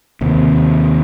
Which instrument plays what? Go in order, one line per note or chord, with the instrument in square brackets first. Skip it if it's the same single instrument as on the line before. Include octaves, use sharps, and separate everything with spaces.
[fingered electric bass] D#2 C3